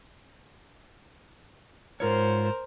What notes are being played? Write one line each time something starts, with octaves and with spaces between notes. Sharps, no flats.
G#2 F4 A#4 C5 C#5